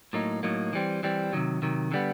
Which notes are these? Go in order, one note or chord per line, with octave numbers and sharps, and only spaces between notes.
A2 F#3 A#3 D#4
A2 F#3 A#3 D#4
E3 G3 C4
E3 G3 C4
C3 D#3 F#3
C3 D#3 F#3
D3 G3 B3